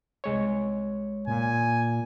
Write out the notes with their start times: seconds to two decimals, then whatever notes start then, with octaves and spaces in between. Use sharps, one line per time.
0.24 C2 G#3 C#5
1.27 A#2 G#5